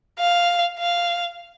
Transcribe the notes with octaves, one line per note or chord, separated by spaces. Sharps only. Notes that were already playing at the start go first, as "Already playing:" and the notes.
F5
F5